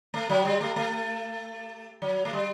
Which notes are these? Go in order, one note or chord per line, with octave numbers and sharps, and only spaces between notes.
A3
F#3
G3
A3
A3
F#3
A3
G3